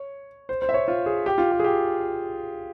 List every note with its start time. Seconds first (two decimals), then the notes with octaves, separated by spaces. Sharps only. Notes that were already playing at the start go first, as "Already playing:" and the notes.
Already playing: C#5
0.49 C5
0.62 C5
0.69 E5
0.74 C#5
0.88 F4
1.06 G#4
1.26 G4
1.38 F4
1.52 G4
1.60 G#4
1.64 G4